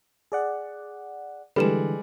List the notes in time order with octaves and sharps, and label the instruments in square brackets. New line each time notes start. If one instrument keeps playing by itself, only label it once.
[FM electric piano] G#4 D5 F#5
[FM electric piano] D3 E3 [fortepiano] G3 G#3 [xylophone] A4 B4 E7